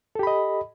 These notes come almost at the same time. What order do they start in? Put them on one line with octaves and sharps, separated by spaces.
A4 G4 B5 D#5